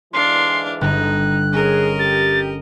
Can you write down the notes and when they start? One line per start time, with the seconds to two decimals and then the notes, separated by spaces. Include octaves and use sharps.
0.13 G#2 D3 E3 D4 F5 C6
0.81 G1 D#4 F#6
1.53 C#4 G#4 A#4 D#5
1.99 G4 A6